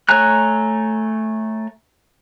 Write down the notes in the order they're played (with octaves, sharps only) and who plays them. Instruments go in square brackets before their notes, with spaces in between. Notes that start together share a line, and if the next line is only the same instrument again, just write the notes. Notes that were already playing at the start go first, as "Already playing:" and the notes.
[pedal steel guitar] A3 C#5 G#5 A#5 F#6